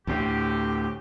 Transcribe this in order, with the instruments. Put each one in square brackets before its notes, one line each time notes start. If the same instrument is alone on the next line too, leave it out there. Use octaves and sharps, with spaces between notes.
[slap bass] D2 A2 [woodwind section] G4